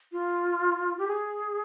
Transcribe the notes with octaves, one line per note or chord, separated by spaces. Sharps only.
F4
G4
G#4